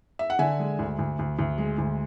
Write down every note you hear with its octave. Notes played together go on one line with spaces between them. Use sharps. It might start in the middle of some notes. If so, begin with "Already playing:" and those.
E5
F#5
D3 E5 G#5
G#3
D2
D2
D2
D2
G#3
D2